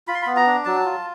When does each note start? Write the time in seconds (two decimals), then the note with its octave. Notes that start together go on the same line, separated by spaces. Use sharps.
0.08 F4 B5
0.14 C6
0.22 B3 B5
0.36 A#5
0.47 D4
0.65 F#3 A5
0.85 F4